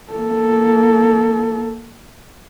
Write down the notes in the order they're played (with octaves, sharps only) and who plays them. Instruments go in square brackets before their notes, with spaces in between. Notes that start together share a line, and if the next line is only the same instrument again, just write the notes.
[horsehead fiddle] A#3 A4